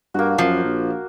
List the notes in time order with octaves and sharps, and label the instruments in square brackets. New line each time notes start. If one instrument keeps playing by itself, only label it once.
[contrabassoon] G2 [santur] A#3 F#4
[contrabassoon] F#2 [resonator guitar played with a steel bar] F3
[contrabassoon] A#1